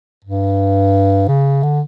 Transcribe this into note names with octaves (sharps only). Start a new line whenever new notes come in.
G2
C#3
D3